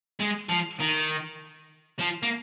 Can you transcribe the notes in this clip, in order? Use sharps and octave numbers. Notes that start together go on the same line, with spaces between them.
G#3
F3
D#3
F3
A#3